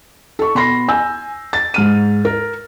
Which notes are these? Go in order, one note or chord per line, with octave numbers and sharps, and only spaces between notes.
A4 C#6
B2 B5 C6 A#6 C7
G#5 E6 G6
A6
G#2 F6 D#7
A#4